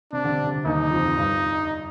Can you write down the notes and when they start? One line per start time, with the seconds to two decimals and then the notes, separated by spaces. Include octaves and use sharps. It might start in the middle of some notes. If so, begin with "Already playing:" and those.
0.13 C3 D4
0.24 D3
0.29 C3
0.47 D3
0.65 D#2 D#3 D#4
0.91 F2 F3
1.05 F2 F3
1.17 G2 G3